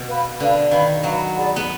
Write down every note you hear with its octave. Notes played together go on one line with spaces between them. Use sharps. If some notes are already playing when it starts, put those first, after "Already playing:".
Already playing: B2
B4 F5 B5
D3 B4 F5 B5
D#3 B4 F5 B5
F#3 B4 F5 B5
G#4 D5 F#5 B5
B3